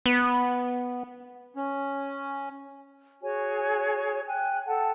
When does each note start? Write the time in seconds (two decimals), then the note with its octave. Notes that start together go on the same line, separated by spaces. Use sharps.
0.06 B3
1.56 C#4
3.23 F#4 G#4 C#5 G#5
4.27 G5 G#5 F#6
4.67 A4 F#5 G5 A5